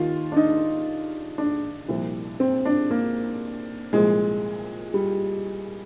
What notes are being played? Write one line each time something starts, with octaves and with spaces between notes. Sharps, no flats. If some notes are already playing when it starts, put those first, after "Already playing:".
Already playing: D#2 D#3 F4
D4
D#4
D4
C2 A#2 F3
C4
D4
A#3
C2 A#2 F3 G#3
G3